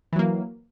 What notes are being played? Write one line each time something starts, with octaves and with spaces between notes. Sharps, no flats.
E3 F#3 A#3